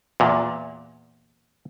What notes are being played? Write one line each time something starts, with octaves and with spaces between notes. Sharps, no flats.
E2 A#2